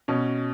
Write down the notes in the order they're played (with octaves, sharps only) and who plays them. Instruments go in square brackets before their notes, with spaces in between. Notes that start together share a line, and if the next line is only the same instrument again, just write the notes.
[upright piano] B2 C#4